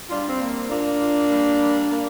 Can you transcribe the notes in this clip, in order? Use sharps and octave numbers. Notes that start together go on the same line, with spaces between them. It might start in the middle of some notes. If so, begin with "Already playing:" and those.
G3 D4 F4
C4
A#3
A#2 A#3 D4
A#2
G3
G3
A#3